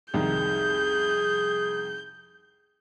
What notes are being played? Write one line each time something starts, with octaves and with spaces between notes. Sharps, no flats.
C2 F2 D#3 G#4 G6